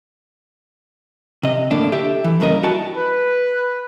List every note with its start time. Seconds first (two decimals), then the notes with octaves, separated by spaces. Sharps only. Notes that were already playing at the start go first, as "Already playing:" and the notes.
1.43 C3 D#5
1.71 A2 D3 A#3 D4
1.92 G4 A4 E5 G5
2.24 E3
2.40 G2 C#3 A#3 A#4 D#5
2.63 G3 E4 F#4 G5 A5
2.96 B4